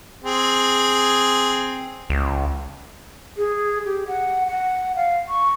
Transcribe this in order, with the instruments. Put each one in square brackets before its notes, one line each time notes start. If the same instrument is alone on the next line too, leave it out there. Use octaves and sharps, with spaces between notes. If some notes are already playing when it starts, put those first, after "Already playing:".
[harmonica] C4 G#4
[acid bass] C#2
[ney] G#4
G4
F#5
F#5
F5
C#6